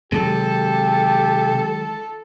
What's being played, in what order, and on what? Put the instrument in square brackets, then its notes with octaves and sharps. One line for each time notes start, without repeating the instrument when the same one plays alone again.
[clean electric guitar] C3 [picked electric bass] D#3 F#3 G#3 [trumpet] G4 [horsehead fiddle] A4